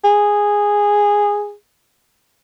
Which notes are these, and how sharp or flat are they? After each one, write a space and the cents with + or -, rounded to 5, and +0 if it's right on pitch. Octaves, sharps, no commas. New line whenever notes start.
G#4 -10